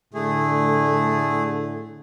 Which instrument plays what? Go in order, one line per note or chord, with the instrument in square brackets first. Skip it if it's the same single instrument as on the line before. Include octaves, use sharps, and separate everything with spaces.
[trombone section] A2 D3 [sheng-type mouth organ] A3 G#4